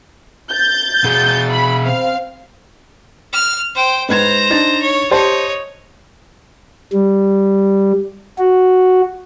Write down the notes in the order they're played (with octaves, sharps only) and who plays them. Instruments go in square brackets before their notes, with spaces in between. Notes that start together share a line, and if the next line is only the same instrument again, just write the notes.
[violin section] G6 A6
[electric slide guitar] B2 G#4
[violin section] B5
C4 F5
[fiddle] F6
C5 G5
[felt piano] G#2 B4 G#6 [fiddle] C5 A#5
[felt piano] D4 D#4 A6
[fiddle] C#5
[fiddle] D#4 C#5 [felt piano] G4 C5 A5
[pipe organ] G3
F#4